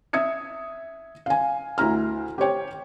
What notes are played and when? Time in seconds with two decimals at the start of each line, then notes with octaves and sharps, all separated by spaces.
0.13 E5 D#6 G#6 C#7
1.26 F5 G#5
1.78 D2 E4 A#5 F6
2.38 G4 C5 C#5 G5